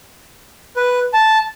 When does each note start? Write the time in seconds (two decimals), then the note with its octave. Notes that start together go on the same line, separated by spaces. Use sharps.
0.76 B4
1.14 A5